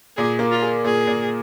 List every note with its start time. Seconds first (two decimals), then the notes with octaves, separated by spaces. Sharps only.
0.17 A#2 G#4
0.39 A#3
0.51 F4
0.62 G#4
0.85 A#2 G#4
1.07 A#2